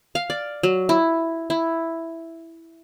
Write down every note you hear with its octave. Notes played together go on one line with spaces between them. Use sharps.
F5
D5
F#3
E4
E4